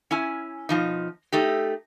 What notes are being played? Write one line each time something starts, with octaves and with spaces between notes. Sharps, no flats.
C#4 E4 G#5
B2 F3 D#4
A3 D#4 G4